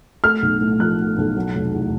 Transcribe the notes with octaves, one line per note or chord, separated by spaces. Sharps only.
A3 F6
B1
A2
F3 F#6
A3
B1
F#3
F1
E2